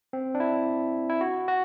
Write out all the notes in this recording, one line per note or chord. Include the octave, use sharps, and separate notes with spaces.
C4
D4
E4
E4
F#4
F#4